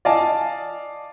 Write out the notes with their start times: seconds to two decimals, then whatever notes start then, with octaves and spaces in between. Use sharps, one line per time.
0.05 D5 D#5 F5 G#5 A5